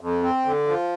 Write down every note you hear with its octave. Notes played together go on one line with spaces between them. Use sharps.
F2
C4
D3
F3